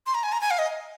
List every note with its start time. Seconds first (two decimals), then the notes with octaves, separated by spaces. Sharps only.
0.06 C6
0.14 A#5
0.23 G#5
0.32 A#5
0.41 G#5
0.51 F5
0.59 D#5